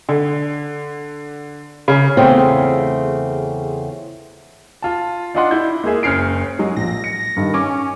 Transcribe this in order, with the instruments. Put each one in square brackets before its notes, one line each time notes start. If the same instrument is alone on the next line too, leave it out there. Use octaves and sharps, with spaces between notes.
[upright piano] D3
C#3
[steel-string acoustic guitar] E2 C#3 A3 C4 F4
[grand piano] F4 A5
D4 D#4 F4 D#5 F#5 C6
E4 G6
G#3 A#3 G#4 E5
F#1 C#4 F6 C7 D7
[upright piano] F#3 [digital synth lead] G#3
[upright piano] A#1 [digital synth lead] A#6
[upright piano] C#7
G2 D#3
[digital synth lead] C#4 [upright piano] D6